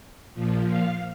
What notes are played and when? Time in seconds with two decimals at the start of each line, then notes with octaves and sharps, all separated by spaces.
0.34 A#2 F3
0.67 F5